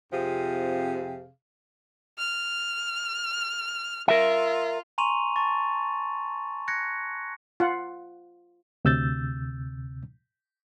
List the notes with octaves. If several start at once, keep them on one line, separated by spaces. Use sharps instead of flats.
F2 C3 F3 G#4 F5
F6
F4 A#4 E5
G#5 A#5 C6 C#6 D#7 F7
A5 C#6 A6
F#6 G#6 A#6 C#7
F4 F#5
D2 C3 E6 G6 A6